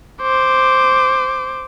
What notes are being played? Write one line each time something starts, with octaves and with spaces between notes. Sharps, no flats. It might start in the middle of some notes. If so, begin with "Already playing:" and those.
C5 D6